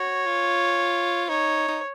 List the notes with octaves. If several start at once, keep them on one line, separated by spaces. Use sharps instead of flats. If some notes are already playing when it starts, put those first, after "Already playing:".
Already playing: F#4 C#5
F4
D#4 C#5
D#4